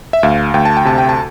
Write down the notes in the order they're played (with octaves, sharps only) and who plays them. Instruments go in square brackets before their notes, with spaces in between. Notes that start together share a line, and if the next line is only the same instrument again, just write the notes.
[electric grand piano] E5
D2 F5
D2 G5
A5
G5
C3 A5
G5
A5